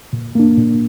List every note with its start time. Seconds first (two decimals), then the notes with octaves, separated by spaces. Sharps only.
0.13 A#2
0.35 A#3 D4
0.57 A#2